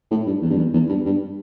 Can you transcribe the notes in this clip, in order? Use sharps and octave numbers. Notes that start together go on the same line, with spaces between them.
A2
G2
E2
G2
E2
E2
G2
G2